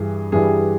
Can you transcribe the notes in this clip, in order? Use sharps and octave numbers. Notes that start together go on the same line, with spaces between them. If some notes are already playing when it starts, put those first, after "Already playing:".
Already playing: G2 E3 G3 G#4
G2 E3 G3 G#4